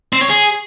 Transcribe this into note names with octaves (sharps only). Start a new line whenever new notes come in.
C4
C#5
G#4